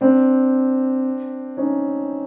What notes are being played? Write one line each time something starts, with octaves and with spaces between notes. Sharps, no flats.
C4 D4
C#4 D#4